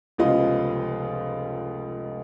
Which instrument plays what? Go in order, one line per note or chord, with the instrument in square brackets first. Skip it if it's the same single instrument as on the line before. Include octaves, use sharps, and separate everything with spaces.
[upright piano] F1 C#2 F3 B3 F4 D#5